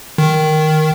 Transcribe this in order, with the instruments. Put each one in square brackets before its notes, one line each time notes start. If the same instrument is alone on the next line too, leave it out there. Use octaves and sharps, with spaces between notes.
[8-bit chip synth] D#3